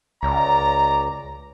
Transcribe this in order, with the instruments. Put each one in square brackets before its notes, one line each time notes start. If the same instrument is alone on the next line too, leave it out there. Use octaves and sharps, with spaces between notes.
[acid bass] C#2 [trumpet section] D5 A#5